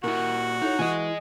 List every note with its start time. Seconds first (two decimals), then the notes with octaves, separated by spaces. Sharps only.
0.04 A#2 E4 F#4 A#4 F#5
0.62 D#4 E4 A4 C#5
0.79 E3 D#5 G#5